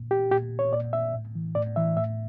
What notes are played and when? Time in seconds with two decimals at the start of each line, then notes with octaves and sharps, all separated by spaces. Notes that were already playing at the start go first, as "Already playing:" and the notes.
Already playing: A#2
0.11 G4
0.31 A#2 G4
0.59 C#5
0.73 A#2 D5
0.93 E5
1.14 A2
1.35 E3
1.55 A2 D5
1.76 E3 E5
1.97 A2 E5